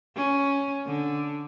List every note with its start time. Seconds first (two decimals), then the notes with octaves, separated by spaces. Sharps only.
0.16 C#4
0.86 D3